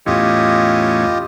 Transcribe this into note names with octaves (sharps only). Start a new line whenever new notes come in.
E2 A2 C#4 F4 G4 D#5